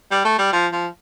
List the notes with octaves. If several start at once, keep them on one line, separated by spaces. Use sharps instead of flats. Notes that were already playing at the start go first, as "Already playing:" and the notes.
G3
A3
G3
F3
F3